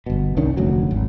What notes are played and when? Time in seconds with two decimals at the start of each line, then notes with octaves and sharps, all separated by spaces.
0.06 G1 B2
0.37 C2 D#3 C#4 D4
0.57 F1 D2 F#3
0.91 G#1